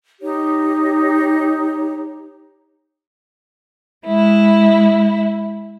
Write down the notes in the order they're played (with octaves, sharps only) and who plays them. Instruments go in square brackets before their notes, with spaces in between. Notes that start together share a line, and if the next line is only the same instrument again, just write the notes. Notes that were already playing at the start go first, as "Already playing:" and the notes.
[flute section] D#4 G4 C#5
[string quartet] G#3 E4